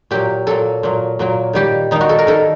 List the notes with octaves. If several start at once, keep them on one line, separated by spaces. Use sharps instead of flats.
A#2 F#3 A#3 G4
A#2 F#3 A#3 A4
A#2 F#3 A#3
A#2 F#3 A#3
D#3 G3 A#3 G4
D#3 G3 A#3 D#4
F#4
A4
A#4
D#3 G3 A#3 A4